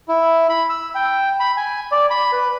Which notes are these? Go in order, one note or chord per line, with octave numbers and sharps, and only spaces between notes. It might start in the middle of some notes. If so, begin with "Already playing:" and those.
E4
B5
E6
G5
B5
G#5
D5
B5
B4